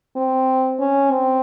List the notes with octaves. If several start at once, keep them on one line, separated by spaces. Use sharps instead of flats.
C4
C#4
C4